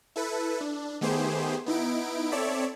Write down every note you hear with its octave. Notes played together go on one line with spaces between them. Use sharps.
E4 A4 B4
D4
D#3 A3 B3 G4 G#4 C5
B3 D#4 E4 D7
C4 A4 C#5 D5 E5